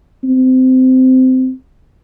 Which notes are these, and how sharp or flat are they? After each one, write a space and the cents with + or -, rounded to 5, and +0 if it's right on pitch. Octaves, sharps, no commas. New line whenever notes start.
C4 -20